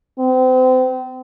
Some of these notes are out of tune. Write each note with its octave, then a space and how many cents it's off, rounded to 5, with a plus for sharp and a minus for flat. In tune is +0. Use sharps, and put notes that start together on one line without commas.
C4 -30